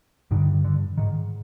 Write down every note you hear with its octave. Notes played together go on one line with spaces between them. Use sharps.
G2 D3 D#3
D3
G#2 D#3